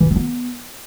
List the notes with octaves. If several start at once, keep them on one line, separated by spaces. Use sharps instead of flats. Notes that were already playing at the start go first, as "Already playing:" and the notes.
E3
D4
C4
B3